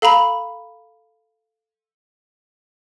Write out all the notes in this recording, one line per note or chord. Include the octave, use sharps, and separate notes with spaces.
A4 F5 A#5 B5 F#7